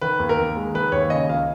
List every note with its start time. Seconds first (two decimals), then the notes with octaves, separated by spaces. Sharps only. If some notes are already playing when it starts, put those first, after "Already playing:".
0.01 D#3 B4
0.20 D#2
0.29 A#4
0.39 D#2
0.57 G#3
0.75 D#3 B4
0.92 D#2 C#5
1.10 C#3 D#5
1.29 C#2 F5